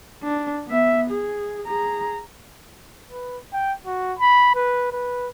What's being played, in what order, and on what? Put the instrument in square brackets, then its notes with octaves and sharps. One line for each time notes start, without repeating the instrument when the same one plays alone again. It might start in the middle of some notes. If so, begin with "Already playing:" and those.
[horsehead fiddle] D4
B3 E5
G#4
G#4 A#5
[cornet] B4
G5
F#4
B5
B4
B4